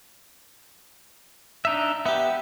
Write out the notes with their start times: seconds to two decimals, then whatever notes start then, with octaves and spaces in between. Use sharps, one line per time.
1.65 D4 D#4 E5
2.06 B3 G4 E5